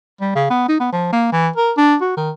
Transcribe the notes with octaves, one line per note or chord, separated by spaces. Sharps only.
G3
C#3
B3
D#4
B3
F3
A#3
E3
A#4
D4
F#4
D#3